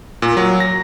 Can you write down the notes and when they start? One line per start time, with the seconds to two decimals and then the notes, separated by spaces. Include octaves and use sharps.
0.22 A#2
0.37 F#3
0.60 A#6